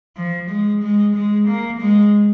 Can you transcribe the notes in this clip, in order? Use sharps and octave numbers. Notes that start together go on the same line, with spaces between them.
F3
G#3
G#3
G#3
A#3
G#3